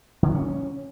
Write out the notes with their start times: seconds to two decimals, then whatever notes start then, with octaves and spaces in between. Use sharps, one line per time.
0.23 D3
0.29 F#3
0.35 C#4